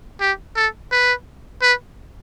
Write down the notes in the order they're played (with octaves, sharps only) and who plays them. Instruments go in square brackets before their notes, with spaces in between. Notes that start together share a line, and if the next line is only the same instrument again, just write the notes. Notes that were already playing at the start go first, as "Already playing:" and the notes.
[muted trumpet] G4
A4
B4
B4